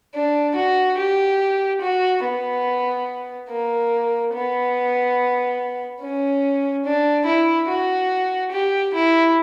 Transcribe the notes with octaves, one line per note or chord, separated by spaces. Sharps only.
D4
F#4
G4
F#4
B3
A#3
B3
C#4
D4
E4
F#4
G4
E4